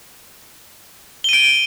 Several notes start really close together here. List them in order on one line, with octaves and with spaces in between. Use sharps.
G7 D#7 D7